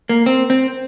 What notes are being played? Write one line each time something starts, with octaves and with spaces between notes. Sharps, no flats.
A#3
C4
C4